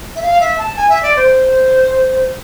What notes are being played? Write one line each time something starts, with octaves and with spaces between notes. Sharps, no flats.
E5
F5
E5
A5
G#5
E5
D5
C5